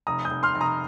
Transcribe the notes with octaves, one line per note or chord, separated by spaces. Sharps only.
F1 A#5 D#6
D#6 G6
F1
C6 F6
F1
A#5 D#6